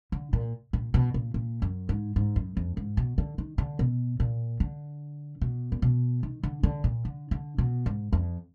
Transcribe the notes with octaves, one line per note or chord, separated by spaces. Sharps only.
D3
A#2
A#2
B2
A#2
A#2
F#2
G#2
G#2
F#2
F2
G#2
B2
D3
D#3
D3
B2
A#2
D3
B2
A#2
B2
D#3
D3
D3
A#2
D3
D3
B2
G#2
F2